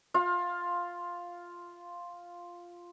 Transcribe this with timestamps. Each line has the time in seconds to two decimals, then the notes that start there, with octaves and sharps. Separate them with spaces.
0.14 F4 F5